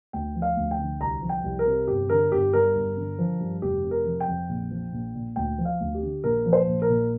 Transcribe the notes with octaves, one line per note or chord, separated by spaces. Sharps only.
D2 G5
F3
F5
D2
G5
D3
C2 A#5
F3
G5
C2
A#4
C3
G1 G4
D3 A#4
G1 G4
G2 A#4
G1
D3
F3
G2
F1 G4
C3
A#4
F3
G5
F2
A#1
F3
A#1
A#2
D2 G5
F3
F5
D2
G4
D3
A#1 A#4
F3
C5
A#1
A#4
A#2